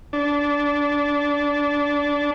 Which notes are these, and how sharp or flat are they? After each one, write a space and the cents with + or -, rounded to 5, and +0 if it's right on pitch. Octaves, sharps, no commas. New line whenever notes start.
D4 -20